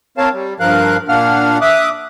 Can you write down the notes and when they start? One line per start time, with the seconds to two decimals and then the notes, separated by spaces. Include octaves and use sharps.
0.18 C4 A#4 C#5 F5 A5
0.33 G3
0.60 G2 F3 A#4 F5 F#6
1.09 A#2 A#3 D4 F5 F#5 F6
1.61 E5 D6 D#6 F#6